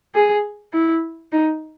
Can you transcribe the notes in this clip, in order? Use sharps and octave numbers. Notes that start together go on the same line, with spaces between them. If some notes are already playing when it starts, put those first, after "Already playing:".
G#4
E4
D#4